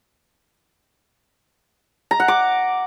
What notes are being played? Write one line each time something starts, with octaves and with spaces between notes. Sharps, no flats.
A#5
F#5
D6